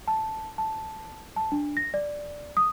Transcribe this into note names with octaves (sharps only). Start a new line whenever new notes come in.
A5
A5
A5
D4
A#6
D5
D#6